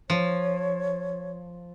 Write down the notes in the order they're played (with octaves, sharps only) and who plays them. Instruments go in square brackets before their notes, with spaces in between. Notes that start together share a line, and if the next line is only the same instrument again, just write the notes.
[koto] F3 [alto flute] C#5